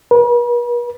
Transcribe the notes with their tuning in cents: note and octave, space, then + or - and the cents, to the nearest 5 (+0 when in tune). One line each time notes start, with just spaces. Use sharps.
B4 -45